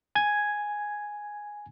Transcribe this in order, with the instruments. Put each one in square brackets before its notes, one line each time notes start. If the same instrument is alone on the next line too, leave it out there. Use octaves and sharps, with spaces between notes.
[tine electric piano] G#5 G#6